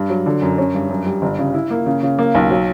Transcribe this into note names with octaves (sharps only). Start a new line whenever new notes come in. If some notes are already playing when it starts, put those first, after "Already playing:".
Already playing: G2
F#3
D3
F#2
C#4
G2
F#2
G3
G1
C#3
E4
A#3
C#3
C#3
A#3
B1
F#3